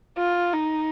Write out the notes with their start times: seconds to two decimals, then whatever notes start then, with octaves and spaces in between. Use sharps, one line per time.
0.18 F4
0.54 D#4